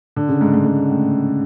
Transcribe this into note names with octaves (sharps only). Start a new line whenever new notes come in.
D3
C#3
G#2
G#2
G#2
A2